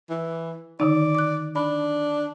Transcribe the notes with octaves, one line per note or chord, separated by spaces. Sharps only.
E3
D3 D#3 D#4 D5
D6 F#6
D4 B5